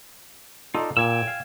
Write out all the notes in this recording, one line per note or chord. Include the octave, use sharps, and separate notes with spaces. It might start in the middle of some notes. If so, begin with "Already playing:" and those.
D#4 F4 A4 D5
A#2 G5 G#5 E6
F5